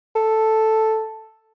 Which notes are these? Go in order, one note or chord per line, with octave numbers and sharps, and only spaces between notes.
A4